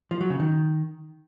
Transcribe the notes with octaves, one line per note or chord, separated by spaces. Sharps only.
F3
F#3
C#3
D#3